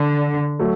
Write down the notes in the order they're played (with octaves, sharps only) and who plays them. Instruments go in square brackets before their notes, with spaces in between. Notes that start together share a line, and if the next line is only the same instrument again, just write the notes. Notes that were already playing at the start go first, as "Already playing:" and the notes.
Already playing: [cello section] D3
[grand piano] F#3 A3